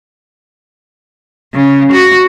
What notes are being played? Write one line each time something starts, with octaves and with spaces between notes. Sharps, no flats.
C#3
F#4